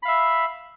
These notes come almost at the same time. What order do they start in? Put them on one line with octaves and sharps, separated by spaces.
B5 F5 E5